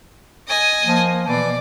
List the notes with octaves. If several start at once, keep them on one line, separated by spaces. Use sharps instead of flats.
D#5 G#5
F3 A#3
B2 E3 D5